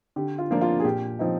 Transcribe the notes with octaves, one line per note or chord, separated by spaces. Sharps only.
D3 G4
F4
F3 A#3 D4
F4
G#4
A#2 G4
F3 C4 D#4